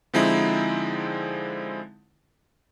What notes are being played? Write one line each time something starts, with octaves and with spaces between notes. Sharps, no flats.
D3 F3 G#3 C4 D#4 E4